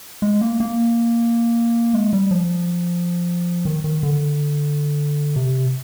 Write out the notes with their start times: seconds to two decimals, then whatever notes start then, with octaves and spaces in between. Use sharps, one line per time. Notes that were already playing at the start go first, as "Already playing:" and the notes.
0.22 G#3
0.41 A#3
0.60 A#3
1.93 G#3
2.13 G3
2.31 F3
3.65 D#3
3.84 D#3
4.03 D3
5.36 C3